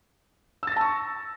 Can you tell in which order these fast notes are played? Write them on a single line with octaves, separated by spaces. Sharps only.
E6 A6 A#6 A5 C#6